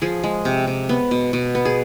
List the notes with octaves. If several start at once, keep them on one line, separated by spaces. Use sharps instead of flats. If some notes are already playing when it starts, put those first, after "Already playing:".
F3 G#4
G#3
C3
C3
B3
B2
B2
B3
G#4